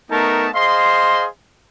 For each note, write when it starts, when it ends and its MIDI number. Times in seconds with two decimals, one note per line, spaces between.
0.10 0.48 57
0.10 0.48 59
0.10 0.48 63
0.10 0.48 70
0.10 0.48 81
0.10 0.48 85
0.54 1.26 68
0.54 1.26 72
0.54 1.26 75
0.54 1.26 77
0.54 1.26 84